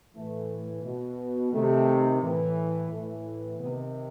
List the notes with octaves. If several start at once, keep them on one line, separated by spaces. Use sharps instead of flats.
A2 E3 A3
B2
C3 D#3 A3
A2 E3
A2 E3 A3
C3 D#3 B3